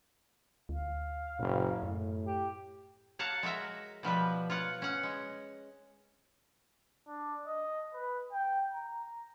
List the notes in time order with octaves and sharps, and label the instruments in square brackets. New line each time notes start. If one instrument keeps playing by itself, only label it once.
[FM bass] D2 [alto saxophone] F5
[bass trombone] F#1 [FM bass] A#2
[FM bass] F#2 [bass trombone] A2
[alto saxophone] G4
[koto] C#5 F5 F#5 A5 A#5
G#3 F#4 A#4 E5 A#5
B2 F3 G3 B4
F4 C#5 F#5
C#4 F#5
G#3
[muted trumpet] D4
D#5
B4
G5
A#5